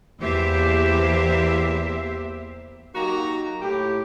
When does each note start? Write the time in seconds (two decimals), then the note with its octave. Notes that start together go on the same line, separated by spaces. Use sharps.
0.19 E2 E3 A#3 G4 C5 E5
2.95 F#3 A#3 D#4 F#4 G4 A#5
3.61 A2 G4